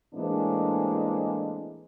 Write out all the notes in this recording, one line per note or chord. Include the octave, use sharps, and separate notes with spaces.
A2 E3 G#3 A#3 C4 D4